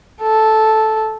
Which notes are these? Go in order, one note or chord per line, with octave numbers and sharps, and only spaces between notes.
A4